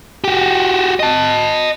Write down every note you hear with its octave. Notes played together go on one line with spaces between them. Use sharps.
F#4 G4
D#5 A5